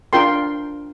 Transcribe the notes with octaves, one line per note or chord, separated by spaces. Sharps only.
D4 F4 A#4 G5 C6